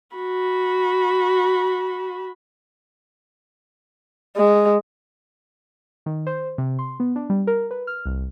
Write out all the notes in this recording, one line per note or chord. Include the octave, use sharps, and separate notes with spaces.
F#4 B5
G#3
D#3
C5
C3
C6
B3
D4
G3
A#4
B4
F6
C2